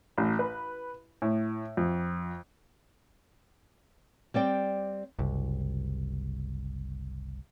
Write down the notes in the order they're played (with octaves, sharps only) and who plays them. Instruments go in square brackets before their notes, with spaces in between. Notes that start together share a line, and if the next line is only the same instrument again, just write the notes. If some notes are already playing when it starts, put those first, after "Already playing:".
[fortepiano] A1
B4
A2
F2
[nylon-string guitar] G3 C4 D5 G5
[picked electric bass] F#1 C2